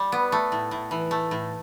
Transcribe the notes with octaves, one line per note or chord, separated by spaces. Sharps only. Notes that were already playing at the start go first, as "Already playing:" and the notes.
Already playing: G3
B3
A3
A2
A2
E3
A3
A2